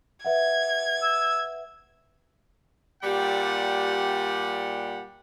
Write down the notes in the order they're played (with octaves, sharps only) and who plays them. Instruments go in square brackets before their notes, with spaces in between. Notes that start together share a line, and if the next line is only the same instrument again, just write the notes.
[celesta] B4 E5 F#5 [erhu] G#6
[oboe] E6
[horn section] A#2 G3 G4 F#5